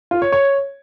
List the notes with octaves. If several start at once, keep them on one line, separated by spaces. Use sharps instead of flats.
F4
C#5
C#5